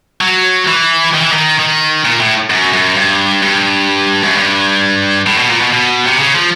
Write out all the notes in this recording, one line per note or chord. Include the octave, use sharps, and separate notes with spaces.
F#3
E3
D#3
E3
D#3
D#3
A#2
A2
F#2
F#2
G2
G2
F#2
G2
A2
B2
A#2
B2
B2
C3
C#3
F3